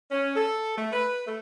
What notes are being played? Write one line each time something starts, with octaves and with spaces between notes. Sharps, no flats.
C#4
A4
A3
B4
A3